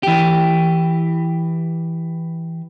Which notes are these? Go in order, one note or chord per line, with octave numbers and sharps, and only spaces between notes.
E3 G4